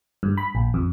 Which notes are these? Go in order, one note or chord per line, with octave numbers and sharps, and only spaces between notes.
G2
B5
A#1
F2